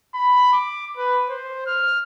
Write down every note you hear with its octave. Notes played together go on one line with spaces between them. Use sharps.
B5
D6
B4
C5
F6